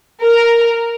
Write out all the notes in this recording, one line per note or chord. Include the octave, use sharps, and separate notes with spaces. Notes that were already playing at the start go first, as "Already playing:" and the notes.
A#4